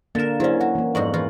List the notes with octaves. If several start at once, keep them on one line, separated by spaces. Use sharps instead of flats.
D3 A#3 A#4 F5 A6 E7
F#3 C#4 E4 C5 D5
F#4 F#5
E3 A#3
F2 G#2 F#4 D5 C#6 F#7
E2 F4 F#4